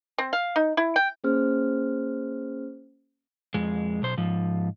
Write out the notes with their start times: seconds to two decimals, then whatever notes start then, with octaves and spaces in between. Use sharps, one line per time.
0.18 C4
0.33 F5
0.56 D#4
0.77 E4
0.96 G5
1.24 A#3 C#4 G#4 C5 F6
3.54 F2 G#3
4.02 B1 C5
4.17 G#2 F3